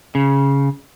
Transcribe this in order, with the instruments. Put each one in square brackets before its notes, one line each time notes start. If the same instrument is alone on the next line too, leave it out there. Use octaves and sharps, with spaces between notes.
[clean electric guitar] C#3